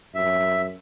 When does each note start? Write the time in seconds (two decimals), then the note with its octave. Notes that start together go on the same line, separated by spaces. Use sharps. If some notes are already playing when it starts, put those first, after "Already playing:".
0.15 F#2 E5